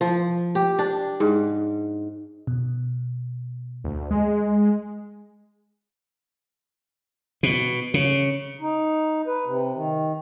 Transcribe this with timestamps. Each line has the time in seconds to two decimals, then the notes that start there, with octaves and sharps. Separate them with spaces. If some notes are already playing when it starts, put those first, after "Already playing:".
0.01 F3
0.55 G4
0.79 D4
1.20 G#2
2.47 B2
3.84 D2
4.11 G#3
7.43 B2
7.94 C#3
8.61 D#4
9.27 B4
9.46 C3
9.74 D#3